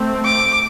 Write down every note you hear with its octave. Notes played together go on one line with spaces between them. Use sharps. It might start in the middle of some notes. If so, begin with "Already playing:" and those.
Already playing: A3 C4
D6